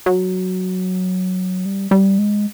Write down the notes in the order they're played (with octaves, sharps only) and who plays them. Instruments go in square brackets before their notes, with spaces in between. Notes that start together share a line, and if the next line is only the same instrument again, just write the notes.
[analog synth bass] F#3
G3
G3
G#3